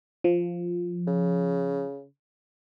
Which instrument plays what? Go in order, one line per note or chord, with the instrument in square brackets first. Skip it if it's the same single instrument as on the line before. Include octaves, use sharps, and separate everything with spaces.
[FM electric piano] F3
[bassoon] C#3